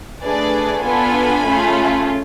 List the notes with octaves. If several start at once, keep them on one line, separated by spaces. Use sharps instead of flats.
A3 D4 G#4 B4 D5
B3 D4 F4 A4 G#5 B5
A3 C#4 F4 G#4